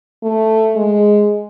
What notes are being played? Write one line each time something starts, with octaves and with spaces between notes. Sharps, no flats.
A3
G#3